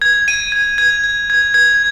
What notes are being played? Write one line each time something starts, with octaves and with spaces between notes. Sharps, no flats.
G#6
D#7
G#6
G#6
G#6
G#6
G#6